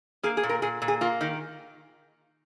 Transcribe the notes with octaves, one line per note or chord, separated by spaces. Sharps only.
A#3 G#4
G#4
A#2
A#4
A#2 G#4
A#2
G#4
A#3 F4
D#3 D#4